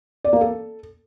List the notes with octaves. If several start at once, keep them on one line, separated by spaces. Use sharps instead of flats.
D5
A#3
A4